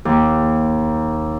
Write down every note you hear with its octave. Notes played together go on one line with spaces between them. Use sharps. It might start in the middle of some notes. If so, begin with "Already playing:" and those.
D#2